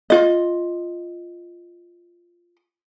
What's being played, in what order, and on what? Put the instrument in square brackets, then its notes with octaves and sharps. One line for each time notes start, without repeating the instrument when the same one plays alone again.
[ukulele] F4 D#5